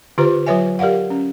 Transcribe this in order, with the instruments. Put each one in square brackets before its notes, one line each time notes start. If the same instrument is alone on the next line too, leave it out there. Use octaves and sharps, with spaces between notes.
[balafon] D3 F4 G4 B4 C5 A#5
F#3 F4 B4 C#5 E5 G#5
G4 A#4 D5 F5 F#5
C#4